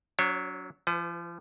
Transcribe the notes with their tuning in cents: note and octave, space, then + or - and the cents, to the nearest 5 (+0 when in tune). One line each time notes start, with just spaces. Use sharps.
F#3 +0 D4 -45 C#5 -30
F3 -35 B4 +35